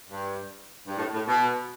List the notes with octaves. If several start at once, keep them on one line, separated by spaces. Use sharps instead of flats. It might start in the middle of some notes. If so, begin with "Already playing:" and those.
G2
G2
A2
A2
B2